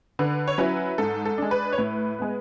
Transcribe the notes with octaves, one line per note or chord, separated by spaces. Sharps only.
D3 B4
C#5
F#3 C#4 E4 B4
G#2 A4
A4
G#3 D4
B4
C#5
A2 B4
G#3 B3